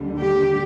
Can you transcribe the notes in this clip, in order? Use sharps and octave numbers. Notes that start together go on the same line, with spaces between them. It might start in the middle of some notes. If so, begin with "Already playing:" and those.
Already playing: D#2 D3 G3
G4